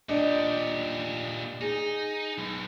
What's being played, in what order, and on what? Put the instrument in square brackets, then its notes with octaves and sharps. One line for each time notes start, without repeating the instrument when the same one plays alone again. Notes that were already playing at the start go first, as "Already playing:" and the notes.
[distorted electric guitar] A#2 G4 [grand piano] D4 D#5
[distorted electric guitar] D#4 [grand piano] G#4
[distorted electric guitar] B1